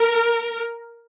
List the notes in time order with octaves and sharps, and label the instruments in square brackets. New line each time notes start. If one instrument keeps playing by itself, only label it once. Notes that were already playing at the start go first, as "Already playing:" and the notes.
Already playing: [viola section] A#4